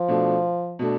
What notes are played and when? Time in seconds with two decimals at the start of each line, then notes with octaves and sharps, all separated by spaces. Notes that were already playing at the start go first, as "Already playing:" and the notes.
Already playing: F3
0.08 B2 A3 D4
0.79 B2 A3 D4